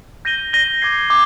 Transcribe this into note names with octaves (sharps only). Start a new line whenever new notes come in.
G6 A#6 D#7 G7
G6 A#6 D#7 G7
D6 G#6 C7
D6 G#6